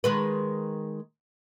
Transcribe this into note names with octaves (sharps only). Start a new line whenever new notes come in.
D#3 G#3 B4